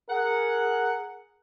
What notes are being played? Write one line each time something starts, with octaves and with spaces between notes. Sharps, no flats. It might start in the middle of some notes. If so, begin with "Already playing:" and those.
G#4 A#4 F#5